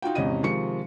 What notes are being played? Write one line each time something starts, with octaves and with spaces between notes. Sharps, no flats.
D#4 F4 F#4 G5
G#1 E2 C3 C#4 D#5 D#7
C3 D#3 F3 G#3 C#6 C#7